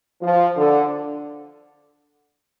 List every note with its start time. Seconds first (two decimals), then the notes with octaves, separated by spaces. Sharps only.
0.22 F3
0.57 D3